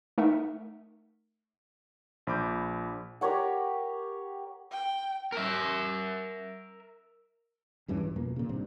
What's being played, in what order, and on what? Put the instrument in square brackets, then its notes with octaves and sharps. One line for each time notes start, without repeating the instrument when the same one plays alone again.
[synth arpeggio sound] A3 D#4 A#4 E5 F#5
[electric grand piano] A#1 B5 D6 G6
[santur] G4 A#4 C#5 F#5
[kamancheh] G5
[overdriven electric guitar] A#4 E5
[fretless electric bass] E2 G2 E3 C#4
A#1
F2 B2 A#3
A#2 C#3
G#1 G2 C3 C4